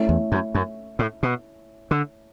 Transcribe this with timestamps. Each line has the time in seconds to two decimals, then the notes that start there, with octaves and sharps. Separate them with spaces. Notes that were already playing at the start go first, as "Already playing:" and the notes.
Already playing: A3 C#4 E4
0.09 E2
0.32 F#2
0.55 F#2
0.99 A2
1.23 B2
1.91 D3